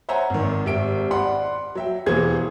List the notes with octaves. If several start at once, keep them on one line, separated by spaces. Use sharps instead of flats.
C5 C#5 E5 F#5 G#5 A#5
G#1 D#3
G#1 G3 G4 E5 G5 D7
D5 F#5 B5 C6
F#3 E5 G5
E1 D#2 E3 G#4 C5 G#6